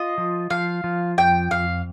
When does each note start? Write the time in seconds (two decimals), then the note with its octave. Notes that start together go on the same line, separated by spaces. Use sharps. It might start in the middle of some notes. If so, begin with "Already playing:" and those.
Already playing: F4 D#5
0.18 F3
0.50 F3 F5
0.84 F3
1.18 F2 G5
1.51 F2 F5